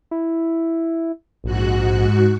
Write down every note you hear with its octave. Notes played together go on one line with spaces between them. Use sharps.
E4
A#1 G#2 F#4 F#5